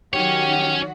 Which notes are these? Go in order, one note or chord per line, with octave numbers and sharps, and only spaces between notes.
D#3 F#3 C#4 F#4 G4 C#5